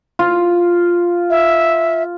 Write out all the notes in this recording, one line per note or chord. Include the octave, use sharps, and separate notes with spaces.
F4
E5